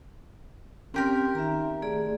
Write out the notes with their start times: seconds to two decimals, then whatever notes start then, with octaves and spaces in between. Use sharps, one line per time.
0.94 A#3 C4 C#4 G4 A#4 C6
1.35 D#3 E5 A#5
1.82 A3 G#4 D5